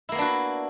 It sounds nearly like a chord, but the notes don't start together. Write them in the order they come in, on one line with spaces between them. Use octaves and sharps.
E4 A#3 B3 D4 F#4